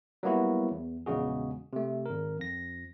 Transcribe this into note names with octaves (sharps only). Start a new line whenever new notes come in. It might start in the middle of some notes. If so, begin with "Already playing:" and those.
F#3 G3 A#3 B3 E4 F#4
E2
A#1 E2 C#3 G#3 F#4 G#4
C3 A3
G#1 A#4
F2 A#6